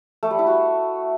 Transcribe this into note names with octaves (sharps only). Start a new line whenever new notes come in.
A3
G3
E4
F#4